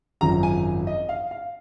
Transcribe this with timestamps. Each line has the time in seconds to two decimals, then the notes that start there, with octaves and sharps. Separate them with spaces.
0.21 G#1 F#2 F3 A#5
0.43 G#5
0.87 D#5
1.09 F5
1.31 F5